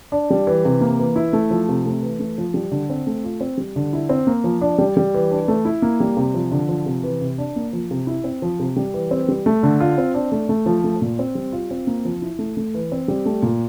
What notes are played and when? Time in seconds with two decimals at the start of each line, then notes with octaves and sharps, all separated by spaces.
0.12 D4
0.30 G3
0.47 E3
0.65 C3
0.81 A#3
0.99 E3
1.16 E4
1.33 A3
1.50 F3
1.69 C3
1.86 A3
2.03 E3
2.20 A3
2.38 F3
2.54 G3
2.71 D3
2.90 C4
3.07 A3
3.24 F4
3.41 C4
3.58 G3
3.76 D3
3.93 E4
4.09 C4
4.27 A#3
4.44 F3
4.61 D4
4.78 G3
4.97 G3
5.14 E3
5.31 D4
5.48 A3
5.65 E4
5.82 A#3
6.00 G3
6.17 C3
6.34 F3
6.52 D3
6.69 F3
6.86 C3
7.03 E3
7.21 C3
7.38 D4
7.56 A#3
7.73 F3
7.91 C3
8.07 E4
8.24 C4
8.42 F3
8.59 C3
8.76 G3
8.94 E3
9.11 C4
9.28 G3
9.46 A3
9.63 D3
9.80 F4
9.98 C4
10.14 D4
10.32 A3
10.49 A3
10.66 F3
10.84 A3
11.01 A#2
11.19 C4
11.35 G3
11.52 F4
11.71 C4
11.87 A#3
12.05 F3
12.22 E4
12.39 A3
12.57 A3
12.74 E3
12.92 C4
13.08 G3
13.26 A3
13.42 A#2